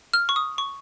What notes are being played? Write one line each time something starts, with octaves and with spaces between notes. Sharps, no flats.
F6
C#6
D#6
C#6